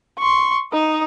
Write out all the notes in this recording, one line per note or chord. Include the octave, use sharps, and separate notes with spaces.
C6 C#6
D#4 D#5